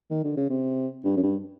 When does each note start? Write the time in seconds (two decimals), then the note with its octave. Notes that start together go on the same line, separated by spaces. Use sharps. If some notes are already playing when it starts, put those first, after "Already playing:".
0.10 D#3
0.24 D3
0.37 C#3
0.50 C3
1.04 G2
1.16 F#2
1.23 G2